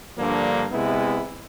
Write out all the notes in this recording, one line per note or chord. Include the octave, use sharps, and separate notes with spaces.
G2 D3 F3 A#3
C3 G#3 B3 E4